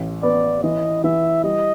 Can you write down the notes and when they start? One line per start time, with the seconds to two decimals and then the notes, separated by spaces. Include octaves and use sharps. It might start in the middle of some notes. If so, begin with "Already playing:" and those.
Already playing: A1
0.23 B3 D5
0.63 E3 D#5
1.04 E3 E5
1.44 G3 D#5